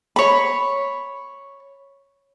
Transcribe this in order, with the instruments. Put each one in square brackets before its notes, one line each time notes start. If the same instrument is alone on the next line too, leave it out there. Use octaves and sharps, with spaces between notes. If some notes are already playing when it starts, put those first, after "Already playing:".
[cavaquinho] C#5 B5